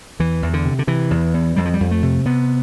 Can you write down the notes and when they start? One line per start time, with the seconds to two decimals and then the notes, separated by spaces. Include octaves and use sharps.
0.20 E2 E3
0.43 E2
0.53 D3
0.65 C3
0.79 D3
0.87 C3 E3
1.11 E2
1.34 E2
1.56 F2 G3
1.65 F3
1.74 G3
1.80 F2
1.91 A3
2.03 C3
2.25 C3 B3